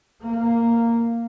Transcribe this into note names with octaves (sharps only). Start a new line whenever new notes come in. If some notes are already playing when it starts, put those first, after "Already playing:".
A#3